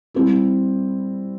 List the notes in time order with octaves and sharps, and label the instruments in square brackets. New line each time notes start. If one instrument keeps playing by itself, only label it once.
[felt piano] G3 C4 E4